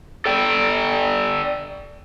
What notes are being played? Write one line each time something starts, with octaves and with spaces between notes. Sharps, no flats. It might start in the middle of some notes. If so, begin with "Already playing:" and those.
A4 D5 G5